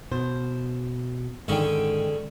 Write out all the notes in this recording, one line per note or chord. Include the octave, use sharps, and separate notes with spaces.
B2 C5
G#2 D3 D#3 G#3 C#4 G5